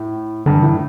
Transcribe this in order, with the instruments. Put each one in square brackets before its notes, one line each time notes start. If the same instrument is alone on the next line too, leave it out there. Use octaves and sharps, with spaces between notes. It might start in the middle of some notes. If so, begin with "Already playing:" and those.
Already playing: [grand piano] A2
[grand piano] G2 [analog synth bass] D3
[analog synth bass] E3
[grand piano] A2 [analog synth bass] D3